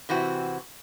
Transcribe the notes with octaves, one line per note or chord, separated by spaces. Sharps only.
C3 E3 C4 F#4